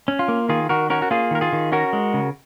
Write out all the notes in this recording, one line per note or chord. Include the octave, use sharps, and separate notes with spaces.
C#4
F4
A#3
D#3 F4 G#4
D#3 F#4 A#4
C#4 F#4 A#4
F#4
A#3 F4 G#4
D#3 A#4
F4 G#4
D#3
C#4 F#4 A#4
G#3
C#3